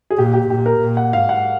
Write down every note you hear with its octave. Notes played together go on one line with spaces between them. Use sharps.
G#4
A#2 G4
G4
A#2 G4
A#4
A#2
F#5
G#2 F5
F#5